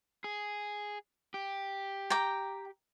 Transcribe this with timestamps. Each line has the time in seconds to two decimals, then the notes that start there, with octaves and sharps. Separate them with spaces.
0.24 G#4
1.34 G4
2.10 G5 A#5 D6